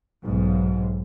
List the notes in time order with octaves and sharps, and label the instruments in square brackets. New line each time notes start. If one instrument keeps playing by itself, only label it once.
[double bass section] B1 G#2